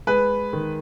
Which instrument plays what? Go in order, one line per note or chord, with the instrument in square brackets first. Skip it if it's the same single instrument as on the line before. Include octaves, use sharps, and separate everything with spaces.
[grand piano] G#3 B4
D#3